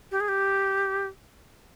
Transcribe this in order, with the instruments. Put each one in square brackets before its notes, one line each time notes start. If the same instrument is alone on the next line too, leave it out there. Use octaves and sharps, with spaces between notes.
[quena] G4
G#4
G4